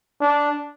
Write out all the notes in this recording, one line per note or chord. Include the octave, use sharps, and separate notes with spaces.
D4